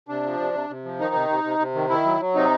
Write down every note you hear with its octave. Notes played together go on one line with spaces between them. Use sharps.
C3 D4
F3
C3
C3
C3
F3
D#3 D#4
C3
C3
C3
C3
D#3
D#3 E4
F#3
F#3
C3 D#4